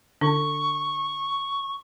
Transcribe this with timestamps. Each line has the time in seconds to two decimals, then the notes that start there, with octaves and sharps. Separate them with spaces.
0.21 D3 D4 C#6